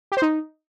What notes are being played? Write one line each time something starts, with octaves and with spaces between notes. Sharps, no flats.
G4
C5
D#4